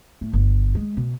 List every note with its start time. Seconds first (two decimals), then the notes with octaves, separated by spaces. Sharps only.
0.21 A2
0.33 G1
0.75 G#3
0.97 B2